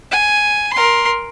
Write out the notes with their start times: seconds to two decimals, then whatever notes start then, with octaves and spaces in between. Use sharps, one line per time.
0.11 G#5
0.73 A#4 C6